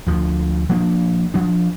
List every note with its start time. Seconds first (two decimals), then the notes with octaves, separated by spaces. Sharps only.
0.07 D2 F3
0.69 F3 A#3 D4
1.34 F3 D4